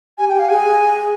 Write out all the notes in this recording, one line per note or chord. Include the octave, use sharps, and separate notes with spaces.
G4 G#5
G5
G4
F5
G#4 G#5